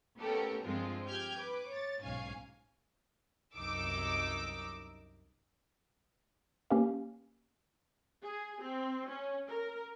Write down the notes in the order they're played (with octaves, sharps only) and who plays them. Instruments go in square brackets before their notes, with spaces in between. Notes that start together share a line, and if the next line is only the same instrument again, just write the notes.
[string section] A3 B3 C#4 G4 A4 A#4
G2 F3 G#3 C4 F4
G4 G5 F6 G6 G#6
B4 D6
C#5 A6
B1 G#2 C#4 F5 G#5
C2 F#2 D#4 D6 E6
[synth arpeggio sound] A#3 C#4 G4 B4 F5
[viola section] G#4
C4
C#4
A#4